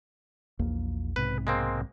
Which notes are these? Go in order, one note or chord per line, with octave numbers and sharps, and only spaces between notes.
A#1 E2 A#3
B1 G#2 C3 B4
G#3 A#3 C4